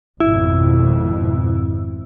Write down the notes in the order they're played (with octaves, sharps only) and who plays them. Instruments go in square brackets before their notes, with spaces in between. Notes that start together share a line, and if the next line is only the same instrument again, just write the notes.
[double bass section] G#1 F2 B2 [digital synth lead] E4